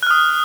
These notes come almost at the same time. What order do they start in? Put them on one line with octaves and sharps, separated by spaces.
F#6 F6 D#6